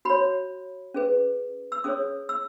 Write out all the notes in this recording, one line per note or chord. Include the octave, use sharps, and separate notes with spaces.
F#4 C#5 B5
C#4 G#4 B4
E6
C#4 G#4 C#5 D#6
E6